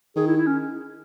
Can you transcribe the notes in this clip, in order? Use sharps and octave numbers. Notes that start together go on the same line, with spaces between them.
D#3 G#4
E4
E4
C#4